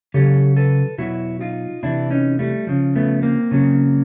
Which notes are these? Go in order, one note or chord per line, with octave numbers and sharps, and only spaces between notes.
C#3 F#3 G4 A4
A4 B4
B2 F#3 E4 F#4
D#4 F4
C3 E3 D4 E4
C#4 D#4
G3 A3
C#3 F3
A3 B3
A#3 C4
C#3 F#3